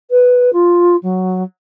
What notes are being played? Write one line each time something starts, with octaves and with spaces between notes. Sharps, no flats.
B4
F4
F#3